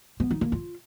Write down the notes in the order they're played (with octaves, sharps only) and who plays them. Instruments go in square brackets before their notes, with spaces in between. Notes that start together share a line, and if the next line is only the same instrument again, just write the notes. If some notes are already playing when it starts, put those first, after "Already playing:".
[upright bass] B3
D#4
A#3
F4